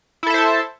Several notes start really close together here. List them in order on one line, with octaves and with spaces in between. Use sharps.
E4 A4 E5 C5 A5